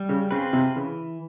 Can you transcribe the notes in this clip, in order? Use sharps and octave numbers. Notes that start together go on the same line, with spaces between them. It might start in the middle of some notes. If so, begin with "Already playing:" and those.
Already playing: G3
C#3
C#3 C4 F4 G#4 B4
C3
C#3 E3